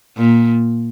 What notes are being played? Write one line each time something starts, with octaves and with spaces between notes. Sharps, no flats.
A#2